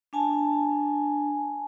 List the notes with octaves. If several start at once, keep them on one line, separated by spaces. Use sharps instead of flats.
D4 G#5 A5